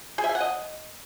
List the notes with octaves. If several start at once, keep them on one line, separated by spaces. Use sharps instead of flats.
G#4
E5
G#5
F#5
D#5